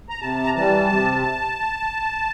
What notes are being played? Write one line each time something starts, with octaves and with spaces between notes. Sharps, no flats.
A#5
C3 A5
A#5
E3 G3 A5
C3